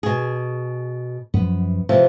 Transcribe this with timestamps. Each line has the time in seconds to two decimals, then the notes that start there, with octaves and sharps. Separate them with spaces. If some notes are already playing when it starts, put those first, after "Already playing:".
0.03 B2 G#4
1.34 F#2 F3 B3
1.89 C3 E3 F3